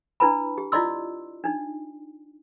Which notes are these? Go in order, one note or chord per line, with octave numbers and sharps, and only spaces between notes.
D4 E4 B4 A5 B5
G4
E4 F4 D5 D#5 C6 E6
D4 D#4